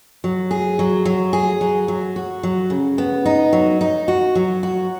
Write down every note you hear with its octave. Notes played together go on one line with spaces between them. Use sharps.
F#3
G#4
F#3
F#3
G#4
F#3
F#3
F#4
F#3
C#3
B3
D#4
F#3
D#4
F#4
F#3
F#4